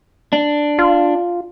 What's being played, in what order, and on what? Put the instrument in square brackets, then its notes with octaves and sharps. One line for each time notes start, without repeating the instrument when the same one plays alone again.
[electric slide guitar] D4
[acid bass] F4